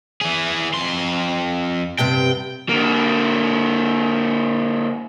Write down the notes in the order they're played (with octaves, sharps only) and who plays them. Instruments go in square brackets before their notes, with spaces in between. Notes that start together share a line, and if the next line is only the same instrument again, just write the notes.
[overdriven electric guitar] E3 G#4
F2 C6
[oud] G2 C3 B3 [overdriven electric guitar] G5
[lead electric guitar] D3 A#3